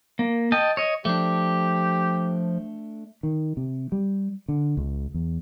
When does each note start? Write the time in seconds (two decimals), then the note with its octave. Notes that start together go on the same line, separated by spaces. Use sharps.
0.19 A#3
0.52 D#5 G5 A5
0.77 C#5 D#5
1.05 F3 A3 D4 G4
3.23 D#3
3.57 C3
3.92 G3
4.48 D3
4.77 C#2
5.14 E2